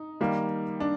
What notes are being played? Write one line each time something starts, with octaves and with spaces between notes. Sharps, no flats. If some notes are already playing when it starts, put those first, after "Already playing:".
Already playing: D#4
D#3 G3 A#3
D4